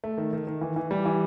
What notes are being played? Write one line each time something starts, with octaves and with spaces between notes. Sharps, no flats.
A3
D#3
D#3
D#3
E3
E3
G3
E3